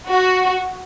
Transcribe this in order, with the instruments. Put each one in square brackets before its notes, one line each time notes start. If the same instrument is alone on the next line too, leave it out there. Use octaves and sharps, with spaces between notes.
[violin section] F#4